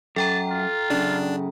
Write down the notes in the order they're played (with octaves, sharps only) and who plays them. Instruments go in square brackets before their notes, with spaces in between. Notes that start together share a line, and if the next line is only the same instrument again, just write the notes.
[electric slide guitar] F#2 [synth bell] A4 G5 A#5 [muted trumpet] A5
[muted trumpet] F4
[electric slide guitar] F#2 C#3 [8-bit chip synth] D4